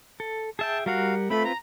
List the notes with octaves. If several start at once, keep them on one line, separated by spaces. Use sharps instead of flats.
A4
G#4 E5 G5 A5
G3 F#4 A#4 F5 F#5
A3 C4 F4 B4 B5
A#5